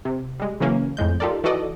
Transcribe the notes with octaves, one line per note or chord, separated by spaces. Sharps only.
C3
G3 G#3
C#3 E3 F#3 A#3 C#4
F2 A2 G#3 G6
D#4 F4 G4 A4 A#4 D5
E3 D#4 F#4 A4 D5 D#5